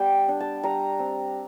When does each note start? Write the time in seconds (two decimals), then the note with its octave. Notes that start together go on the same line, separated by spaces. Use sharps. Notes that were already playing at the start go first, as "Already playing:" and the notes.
Already playing: G3 B3 G5
0.28 D4
0.40 A5
0.63 G3 A#5
0.99 C4